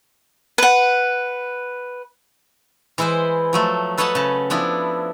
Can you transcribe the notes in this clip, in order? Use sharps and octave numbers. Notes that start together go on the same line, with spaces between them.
B4 F#5
E3 G#3 E4 B4 C5
F3 F#3 A3
A4 B4 C#5 D#5 F#5 A5
C#3 A5
F3 B3 D4 E4